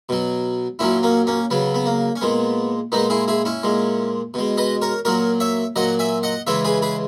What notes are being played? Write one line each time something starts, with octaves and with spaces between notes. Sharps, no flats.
B2 F#3
A#2 F#3 C#4 E4
A#3 C#4
A#3 C#4
C#3 F#3 B3
B3
A#3
C#4
A#2 G#3 B3
A#2 G#3 B3 D#4
E4 G#4
E4 G#4
C#4 E4
A#2 G#3
B2 G#3
B4 D#5
A#4 C#5
A#2 F#3 A#4 C#5
C#5 E5
A#2 F#3 D#5 F#5
E5 G#5
D#5 F#5
C#3 E3 G#3 C#5 E5
G#4 B4
G#4 B4